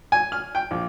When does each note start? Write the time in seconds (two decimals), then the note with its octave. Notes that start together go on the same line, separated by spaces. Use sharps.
0.12 G#5
0.32 F6
0.55 G5
0.71 A#1